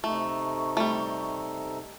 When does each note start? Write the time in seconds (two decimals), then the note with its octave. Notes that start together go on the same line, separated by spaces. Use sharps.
0.04 C3 A3 D#4 A4 C#6
0.77 G3 A3